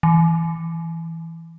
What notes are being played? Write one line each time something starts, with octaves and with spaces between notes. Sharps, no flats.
E3